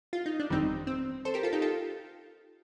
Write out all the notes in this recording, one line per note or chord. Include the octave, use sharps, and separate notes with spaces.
F4
D#4
D4
G1 F2 D#3 G3 C4 D#4
C4
A4 C5
G4 A#4
F4 A4
D#4 G4
F4 A4